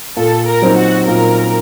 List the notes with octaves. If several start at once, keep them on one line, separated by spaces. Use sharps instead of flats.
A#2 A4
A#4
F#3 C4 D#4
F#4
A#2 A#4